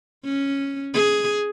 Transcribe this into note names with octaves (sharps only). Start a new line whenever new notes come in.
C#4
G#4